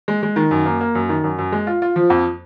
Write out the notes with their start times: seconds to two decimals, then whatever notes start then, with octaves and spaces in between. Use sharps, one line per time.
0.08 G#3
0.23 G#3
0.36 D#3
0.51 F#2
0.66 A#3
0.81 A#3
0.95 F#2
1.09 D#3
1.24 F#2
1.39 F#2
1.52 G#3
1.67 F4
1.82 F4
1.96 F3
2.10 F2